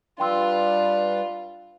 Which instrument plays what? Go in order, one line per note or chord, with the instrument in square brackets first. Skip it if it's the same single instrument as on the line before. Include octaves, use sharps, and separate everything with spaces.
[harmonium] G3 B4 [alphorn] D4 [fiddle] F4 [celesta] G5 C6 E6